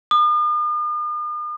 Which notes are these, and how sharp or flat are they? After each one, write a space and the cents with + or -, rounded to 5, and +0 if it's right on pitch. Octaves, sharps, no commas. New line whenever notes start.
D#6 -45